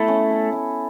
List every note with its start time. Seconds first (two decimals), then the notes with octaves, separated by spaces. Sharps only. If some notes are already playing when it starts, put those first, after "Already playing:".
Already playing: A3 B3 E4
0.08 C#4
0.31 A4
0.53 E4